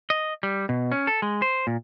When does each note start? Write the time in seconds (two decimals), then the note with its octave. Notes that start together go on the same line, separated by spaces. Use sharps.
0.10 D#5
0.43 G3
0.69 B2
0.92 C#4
1.07 A4
1.22 G#3
1.42 C5
1.67 A#2